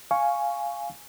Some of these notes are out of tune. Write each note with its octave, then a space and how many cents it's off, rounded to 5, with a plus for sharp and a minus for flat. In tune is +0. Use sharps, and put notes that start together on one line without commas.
F5 +0 G#5 +0 C#6 +0